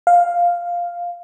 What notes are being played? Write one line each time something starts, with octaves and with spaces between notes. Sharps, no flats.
F5